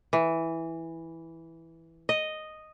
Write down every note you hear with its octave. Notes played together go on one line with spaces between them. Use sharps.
E3
D#5